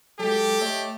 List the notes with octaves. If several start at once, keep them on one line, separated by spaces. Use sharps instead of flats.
F#3 G#3 G4 A4
A3 C#5 D#5